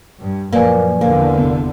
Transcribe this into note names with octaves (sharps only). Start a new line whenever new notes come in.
G2
F#2 A#2 F3 A#3 B4 D5 G#5
E2 D3 A#3
G1 C3 B3